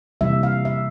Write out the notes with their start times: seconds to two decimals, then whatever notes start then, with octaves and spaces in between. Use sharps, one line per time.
0.21 C3 E3 G3 A#3 E5
0.43 F5
0.65 E5